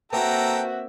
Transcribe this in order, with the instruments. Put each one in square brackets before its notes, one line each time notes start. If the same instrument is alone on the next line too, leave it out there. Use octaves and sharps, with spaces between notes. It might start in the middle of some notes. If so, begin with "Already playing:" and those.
[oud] A#3 C4 B4 [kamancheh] F#4 E5 [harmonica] A4 G5 A#5